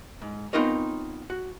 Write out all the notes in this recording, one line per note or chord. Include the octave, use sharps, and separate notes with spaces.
G#2
B3 C4 D#4 F4 A#4 C#5
F#4